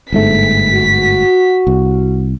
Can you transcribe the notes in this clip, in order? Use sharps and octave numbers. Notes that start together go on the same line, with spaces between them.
G1 G#2 A3 B6
F#4
C2